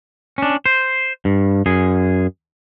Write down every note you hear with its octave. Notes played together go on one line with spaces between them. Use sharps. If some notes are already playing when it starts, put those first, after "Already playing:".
C#4 D4
C5
G2
F#2 G#4